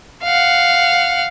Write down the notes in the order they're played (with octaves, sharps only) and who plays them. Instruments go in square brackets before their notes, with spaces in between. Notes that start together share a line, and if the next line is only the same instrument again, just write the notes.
[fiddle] F5 F#5